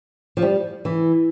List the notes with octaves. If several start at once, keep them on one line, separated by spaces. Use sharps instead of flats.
F3
G3
E3